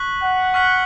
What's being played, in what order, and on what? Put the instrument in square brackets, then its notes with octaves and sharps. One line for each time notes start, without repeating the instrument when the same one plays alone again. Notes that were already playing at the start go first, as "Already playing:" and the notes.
Already playing: [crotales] C#6 F#6 B6 F#7
[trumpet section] F#5
[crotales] C#6 F6 B6 F#7